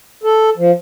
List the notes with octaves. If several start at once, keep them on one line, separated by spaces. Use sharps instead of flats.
A4
F3